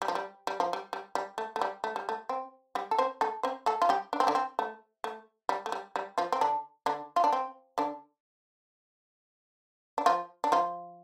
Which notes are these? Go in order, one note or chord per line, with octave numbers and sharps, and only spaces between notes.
G3
F3
G3
G3
F3
G3
G3
G3
A3
A3
G3
A3
G3
A3
C4
G3 G4
A4
C4 C5
A3 A4
C4 C5
A3 A4
F4
G3 G4
D4
C4
D3 D4
C4
A3
A3
G3
A3
G3
G3
F3 F4
C4
D3 D4
D3 D4
F4
D4
C4
D3 D4
D4
F3 F4
D4
F3 F4